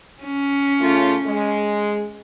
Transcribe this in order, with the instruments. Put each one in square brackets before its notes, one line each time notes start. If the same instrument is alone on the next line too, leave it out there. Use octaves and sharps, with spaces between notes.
[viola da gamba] C#4
[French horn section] C#3 A3 F4
G#3